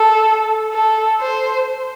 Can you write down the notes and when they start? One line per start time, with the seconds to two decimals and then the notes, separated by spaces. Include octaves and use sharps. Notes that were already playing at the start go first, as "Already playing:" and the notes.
Already playing: A4
0.73 A4
1.21 C5